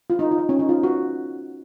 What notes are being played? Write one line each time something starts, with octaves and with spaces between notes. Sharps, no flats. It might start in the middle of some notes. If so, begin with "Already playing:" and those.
F4
D#4
F4
D#4
C#4
D#4
F4
F#4